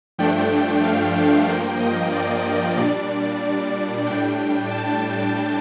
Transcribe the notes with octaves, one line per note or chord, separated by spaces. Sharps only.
G2 F3 A3 D4 G5
F5
G5
G2 F3 A#3 G5
D#5
D5
A#2 G3 D4 D5
A2 G3 D4 G5
A5